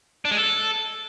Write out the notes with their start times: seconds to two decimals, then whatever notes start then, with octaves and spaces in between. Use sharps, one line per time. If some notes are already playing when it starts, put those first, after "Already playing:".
0.25 D4
0.31 G#3
0.37 A4